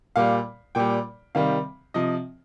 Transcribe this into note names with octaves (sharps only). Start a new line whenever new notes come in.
A#2 G3 F5
A#2 G3 G5
C3 D#3 G3 F5
C3 F3 D#5